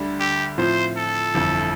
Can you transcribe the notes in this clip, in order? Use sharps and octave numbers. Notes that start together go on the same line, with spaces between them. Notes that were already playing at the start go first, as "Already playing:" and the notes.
Already playing: D2 D3 G3 D4
G4
A2 F3 C4 F4 C5
A4
G1 F2 E3